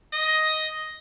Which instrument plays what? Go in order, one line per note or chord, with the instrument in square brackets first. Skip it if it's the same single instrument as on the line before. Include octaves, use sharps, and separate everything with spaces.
[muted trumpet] D#5